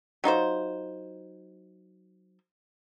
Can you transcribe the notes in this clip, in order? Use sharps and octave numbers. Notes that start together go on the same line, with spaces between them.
F#3 D#4 F4 C5